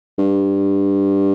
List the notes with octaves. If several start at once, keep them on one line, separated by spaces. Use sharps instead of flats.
G2